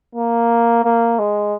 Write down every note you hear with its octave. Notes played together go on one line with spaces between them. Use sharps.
A#3
A#3
G#3